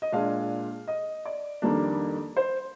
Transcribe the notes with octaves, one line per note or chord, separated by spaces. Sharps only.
D#5
A#2 G#3 D4 F5
D#5
D5
F2 D#3 G3 A#3 D4
C5